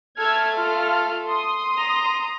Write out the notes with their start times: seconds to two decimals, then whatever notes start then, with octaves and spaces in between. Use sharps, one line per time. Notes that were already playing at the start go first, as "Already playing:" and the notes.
0.19 A3 A4 E6 F6 G#6
0.56 F4 F6
1.27 C6 D#6
1.78 A#5